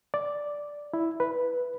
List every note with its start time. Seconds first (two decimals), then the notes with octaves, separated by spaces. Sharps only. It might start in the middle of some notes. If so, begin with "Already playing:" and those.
0.14 D5
0.93 E4
1.20 B4